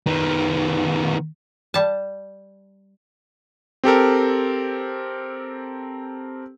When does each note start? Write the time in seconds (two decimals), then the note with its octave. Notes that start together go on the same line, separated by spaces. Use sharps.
0.07 D#3 B3
1.74 G3 A5
3.84 C4 G4 A4 A#4